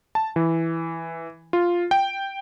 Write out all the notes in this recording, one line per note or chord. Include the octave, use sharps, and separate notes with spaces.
A5
E3
F4
G5